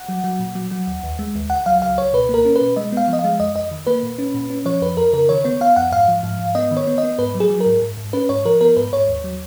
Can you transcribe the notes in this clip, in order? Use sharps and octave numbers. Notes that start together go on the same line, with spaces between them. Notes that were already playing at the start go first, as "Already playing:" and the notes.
Already playing: F#5
F#3
F#3
A#2
F#3
F#3
D#2
D#2
G#3
D#2
C#2 F#5
F#3 F5
C#2 F5
C#2 C#5
B2 B4
A#3 A#4
C#4
B4
B2
G#3 D#5
B3 F5
F3
D#5
F5
G#3
F2 D#5
F2 D#5
D#3
A#3 B4
A#2
C#4
A#2
C#4
F3 C#5
F2 B4
F2 A#4
C#3 A#4
D#3 C#5
B3 C#5
B3 F5
F2 F#5
G#2 F5
F3
G#2
G#2
B3 D#5
D#3
C#5
B3
D#5
B3
G#2 B4
F#3
G#4
F#3
A#4
G#2
G#2
G#2
C#4 B4
G#2 C#5
F3 A#4
B3 A#4
G#2 B4
G#2 C#5
D#2
F#3